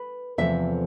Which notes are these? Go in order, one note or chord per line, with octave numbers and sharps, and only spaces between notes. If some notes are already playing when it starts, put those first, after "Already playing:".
Already playing: B4
E2 C3 F3 A3 E5